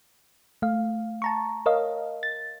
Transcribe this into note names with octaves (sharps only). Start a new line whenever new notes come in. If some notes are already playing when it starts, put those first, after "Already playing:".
A3 F5
A5 A#5 C#6
A#4 C#5 D#5 F5
A6